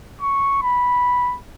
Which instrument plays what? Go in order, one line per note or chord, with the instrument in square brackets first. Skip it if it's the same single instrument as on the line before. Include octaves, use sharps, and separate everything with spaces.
[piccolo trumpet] C#6
B5